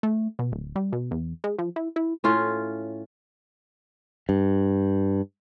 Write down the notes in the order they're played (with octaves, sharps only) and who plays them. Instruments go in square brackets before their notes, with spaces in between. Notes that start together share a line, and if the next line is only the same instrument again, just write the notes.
[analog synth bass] A3
B2
D1
G3
B2
E2
G#3
F3
E4
E4
[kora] A2 C#4 F4
[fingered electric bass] G2